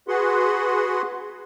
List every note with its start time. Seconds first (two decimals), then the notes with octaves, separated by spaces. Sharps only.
0.08 F#4 G#4 B4 F#5 C6